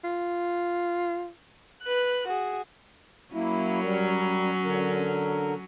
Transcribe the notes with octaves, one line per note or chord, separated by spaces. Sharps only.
F4
B4 F#6
F#4 G#4
F#3 A#3 C#4 E4
G3 A#4
D3 A#4